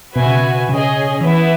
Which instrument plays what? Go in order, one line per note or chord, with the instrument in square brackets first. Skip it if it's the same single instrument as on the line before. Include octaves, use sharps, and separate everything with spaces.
[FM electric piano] B2 [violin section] F#4 B4 E5 G#5
[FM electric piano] C#3
B2
[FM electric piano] C#3 [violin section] C#4 G#4 D#5
[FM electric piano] E3 [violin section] B3 E4 B4 E5